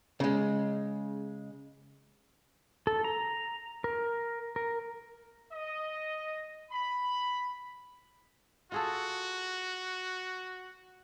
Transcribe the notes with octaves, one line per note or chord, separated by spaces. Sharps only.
C#3 G#3
A4
A#5
A#4
A#4
D#5
B5
F4 F#4 G#4 A4